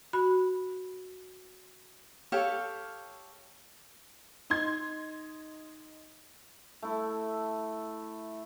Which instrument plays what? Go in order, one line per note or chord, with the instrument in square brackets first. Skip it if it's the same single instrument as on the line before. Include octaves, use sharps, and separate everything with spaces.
[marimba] F#4 B5
[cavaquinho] G4 A4 C#5 F5
[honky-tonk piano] D#4 C6 G#6
[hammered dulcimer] A3 E4